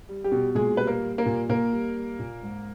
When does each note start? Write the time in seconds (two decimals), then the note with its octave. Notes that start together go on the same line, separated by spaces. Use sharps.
0.09 G3
0.24 G3 G4
0.32 B2
0.55 A#2 G#3 G#4
0.77 G3 B4
0.87 A#3 A#4
1.03 G3
1.18 A#3 A#4
1.26 A#2
1.49 A#2 A#3 A#4
1.72 G3
1.96 G3
2.19 A#2
2.43 G#2